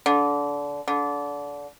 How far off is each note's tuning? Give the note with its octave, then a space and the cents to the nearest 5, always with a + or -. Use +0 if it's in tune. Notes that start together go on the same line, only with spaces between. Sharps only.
D3 -25
D3 -25